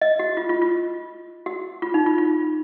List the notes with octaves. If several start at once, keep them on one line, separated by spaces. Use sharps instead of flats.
D#5
F#4
F4
F4
F4
F#4
F4
D#4
F4
F4